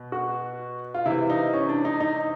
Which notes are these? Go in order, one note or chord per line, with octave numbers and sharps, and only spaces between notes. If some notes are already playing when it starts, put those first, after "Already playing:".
Already playing: B2
F#4
F4
C3 E3 E4
D#4
C#4
D4
D#4
D#4